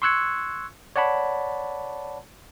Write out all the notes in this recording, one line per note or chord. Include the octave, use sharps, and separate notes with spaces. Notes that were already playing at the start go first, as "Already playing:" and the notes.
C6 C#6 E6 F#6 G#6 C#7
C#5 D5 F#5 A5 B5